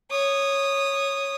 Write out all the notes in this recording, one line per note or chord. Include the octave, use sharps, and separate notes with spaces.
C#5 D#6